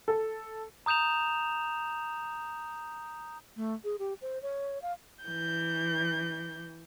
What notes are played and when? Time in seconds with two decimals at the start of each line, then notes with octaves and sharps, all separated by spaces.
0.08 A4
0.86 A#5 D#6 G6 E7 F7
3.56 A3
3.84 G#4
3.99 G4
4.22 C5
4.42 C#5
4.82 F5
5.25 E3 G6